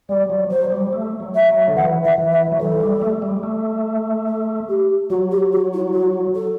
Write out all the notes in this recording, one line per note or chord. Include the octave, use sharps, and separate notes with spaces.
G3 D5
F#3
F#3 C5
G3
A3
F#3
E5
F#3
D3
E3 F#5
E5
E3
E5
F#3
E3 A4
G3
A3
G3
A3
A4
G4
F#3 F#4
G4
F#4
E4
F#4
A4